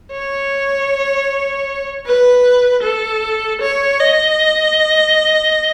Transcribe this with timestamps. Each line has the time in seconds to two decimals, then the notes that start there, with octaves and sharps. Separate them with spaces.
0.12 C#5
2.06 B4
2.83 A4
3.62 C#5
4.00 D#5